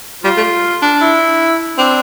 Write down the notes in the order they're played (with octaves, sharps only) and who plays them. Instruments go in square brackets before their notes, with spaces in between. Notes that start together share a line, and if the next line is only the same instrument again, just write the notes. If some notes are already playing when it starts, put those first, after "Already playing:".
[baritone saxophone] G3 [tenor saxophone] F4
[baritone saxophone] A3
D4
[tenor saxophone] E4
[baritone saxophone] C4 [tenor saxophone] D4